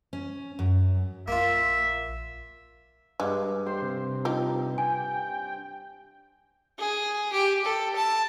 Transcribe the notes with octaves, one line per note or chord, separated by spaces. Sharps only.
C#4
F#2
A#1 A#3 F4 E5
G2 G#3
G4 C5 C6
C3
D#4 F4 G4
G5 G#5
G#4
G4
A4
A5